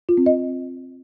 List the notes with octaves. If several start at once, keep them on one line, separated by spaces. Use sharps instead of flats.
F4
C4
D#5